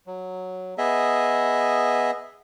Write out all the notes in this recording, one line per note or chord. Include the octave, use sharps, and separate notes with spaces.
F#3
B3 G#4 D#5 E5